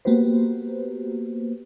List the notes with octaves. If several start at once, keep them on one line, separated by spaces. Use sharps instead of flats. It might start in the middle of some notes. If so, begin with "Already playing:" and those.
A#3 B3 F#4 G4 B4 C5